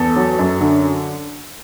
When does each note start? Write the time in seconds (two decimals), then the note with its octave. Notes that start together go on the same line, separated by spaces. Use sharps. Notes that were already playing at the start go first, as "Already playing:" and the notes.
Already playing: E2 A4
0.16 F#3
0.39 F#2
0.61 D3